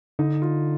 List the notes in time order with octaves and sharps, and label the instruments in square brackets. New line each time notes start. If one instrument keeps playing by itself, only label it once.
[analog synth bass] D3 [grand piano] D#4
[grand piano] F4